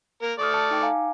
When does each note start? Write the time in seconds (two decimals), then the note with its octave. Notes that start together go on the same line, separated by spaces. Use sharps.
0.22 A#3 A#4
0.39 A3 D5 C#6 D#6 F6
0.54 A5 E6 C#7
0.71 D#4 G5 D6
0.82 F5 G#5 A#5